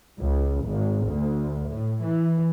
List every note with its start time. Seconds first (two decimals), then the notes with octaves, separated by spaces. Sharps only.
0.20 C#2
0.67 G#1
1.08 D2
1.70 A2
2.05 E3